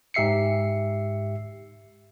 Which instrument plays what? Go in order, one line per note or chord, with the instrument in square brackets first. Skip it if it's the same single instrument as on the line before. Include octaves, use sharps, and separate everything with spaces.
[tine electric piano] G#2 G4 E5 C7 C#7